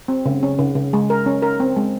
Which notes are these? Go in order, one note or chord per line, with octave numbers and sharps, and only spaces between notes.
C4
C#3
C#4
C#3
C#3
G#3
A#4
C#4
A#4
C4
G#3